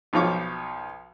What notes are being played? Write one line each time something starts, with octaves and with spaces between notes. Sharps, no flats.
B1 F3 F4 C#5 D6